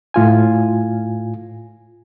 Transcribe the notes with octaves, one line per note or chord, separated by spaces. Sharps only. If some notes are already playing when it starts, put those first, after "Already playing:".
A2 F4 G#5